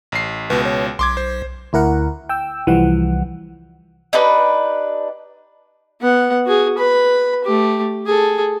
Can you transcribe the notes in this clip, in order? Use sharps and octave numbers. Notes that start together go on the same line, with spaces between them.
A1 C7
C#2 B2 B4
C#5
B1 C6 D6 G#6
C5
D2 E4 A#4 F#5
G5 E6
C2 E3 F3 G3 F#5
D4 D#4 G4 B4
B3 F#5
F#4 G#4
B4 B5
A3 G4
G#4 A4